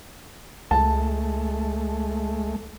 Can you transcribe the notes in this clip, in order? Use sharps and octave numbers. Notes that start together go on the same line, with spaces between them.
C#2 G#3 A3 A5